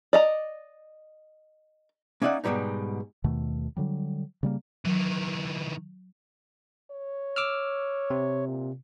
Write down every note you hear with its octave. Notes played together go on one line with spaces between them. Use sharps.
D5 D#5 A#5
A#3 C#4 D#4 D5 E5 F#5
G#2 B2 G3 B3 D#4
D#2 B2 D#3 A3
D3 F#3 G3
C#3 G3 A#3
D#3 E3 F#3
C#5
D6 E6 F6
C3
A#2